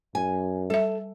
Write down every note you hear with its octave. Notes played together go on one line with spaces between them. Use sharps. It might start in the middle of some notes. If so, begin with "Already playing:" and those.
F#2 G#5
G3 A4 E5